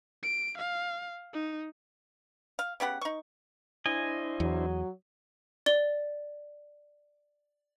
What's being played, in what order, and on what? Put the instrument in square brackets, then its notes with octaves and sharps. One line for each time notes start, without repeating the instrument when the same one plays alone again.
[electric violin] D7
F5
D#4
[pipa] F5
C#3 B3 G4 F#5
D#4 C#6
[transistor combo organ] D4 E4 C5 [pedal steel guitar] D#5 G#5
[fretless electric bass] E2 [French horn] F#3
[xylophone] D5 G7